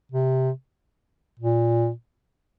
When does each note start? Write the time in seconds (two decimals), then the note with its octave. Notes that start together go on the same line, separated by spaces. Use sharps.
0.12 C3
1.40 A#2